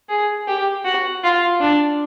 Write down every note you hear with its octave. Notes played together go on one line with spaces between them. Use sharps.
G#4
G4
F#4
F4
D4